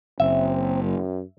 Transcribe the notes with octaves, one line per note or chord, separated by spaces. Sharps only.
F#1 C4 E5
F#2